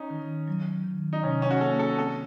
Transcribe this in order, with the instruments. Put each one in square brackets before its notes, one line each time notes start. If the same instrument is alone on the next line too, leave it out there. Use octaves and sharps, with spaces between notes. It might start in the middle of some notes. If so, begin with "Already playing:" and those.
Already playing: [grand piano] C#4 D#4
[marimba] D#3
F#3
D#3
[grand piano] D#4
[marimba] C3 [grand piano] C#4
[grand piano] C#4
F#4
[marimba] A#3 [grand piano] A4
[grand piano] A4
[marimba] C4 [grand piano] A4